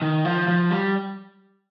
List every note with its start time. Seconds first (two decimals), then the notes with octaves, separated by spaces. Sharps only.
0.02 D#3
0.25 F3
0.48 F3
0.71 G3